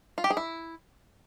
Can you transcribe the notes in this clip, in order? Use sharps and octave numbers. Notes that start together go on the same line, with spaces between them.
F4
G4
G#4
E4